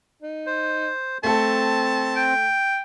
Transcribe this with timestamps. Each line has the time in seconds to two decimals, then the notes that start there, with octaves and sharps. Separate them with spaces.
0.22 D#4
0.46 C5
1.24 A3 C4 A4 A5
2.16 G5